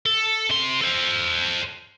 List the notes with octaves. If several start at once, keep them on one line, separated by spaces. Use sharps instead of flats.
A4
C3 C6
A4 C5